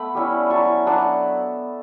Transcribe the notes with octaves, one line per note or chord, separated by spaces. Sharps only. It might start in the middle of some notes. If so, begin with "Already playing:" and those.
Already playing: A3 B3 B5
G3 C#4 E4
F#3 C#4 E4 A5 C#6
F#3 B3 D4 F#5 A5